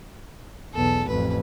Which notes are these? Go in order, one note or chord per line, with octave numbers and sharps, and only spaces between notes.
B1 E2 A4
A1 F2 B4